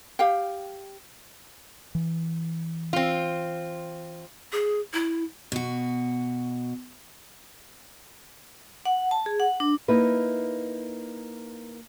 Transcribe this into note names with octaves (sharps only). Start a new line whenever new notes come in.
G4 F5 G5
E3
C4 F4
G#4
E4
B2 F#4
F#5
A5
G#4
F#5
D4
A#3 D#4 E4 B4